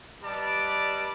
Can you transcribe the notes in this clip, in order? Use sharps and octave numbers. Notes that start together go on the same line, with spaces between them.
G3 B4 D5 D#5 A5 D6